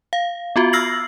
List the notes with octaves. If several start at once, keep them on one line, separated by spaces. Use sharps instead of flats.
F5
B3 F4 F#4
E6 F6 A#6 C7 F#7